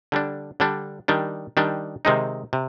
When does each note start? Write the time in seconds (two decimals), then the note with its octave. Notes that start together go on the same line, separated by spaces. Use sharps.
0.12 D3 G3 D4
0.60 D3 G3 D4
1.08 D#3 G3 D4
1.57 D#3 G3 D4
2.05 C3 D#3 G#3 C4 D#4
2.53 C3